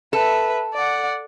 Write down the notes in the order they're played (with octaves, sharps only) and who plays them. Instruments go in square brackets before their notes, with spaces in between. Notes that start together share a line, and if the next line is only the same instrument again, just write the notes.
[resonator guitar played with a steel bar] A4 [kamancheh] B4 E5
[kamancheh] D5 F#5